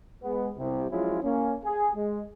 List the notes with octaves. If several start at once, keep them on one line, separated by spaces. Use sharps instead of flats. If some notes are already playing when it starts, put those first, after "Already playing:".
G#3 B3
C2 C3
F3 F#3 G#3 C#4 E4 F4
A#3 C#4
G#4
G#3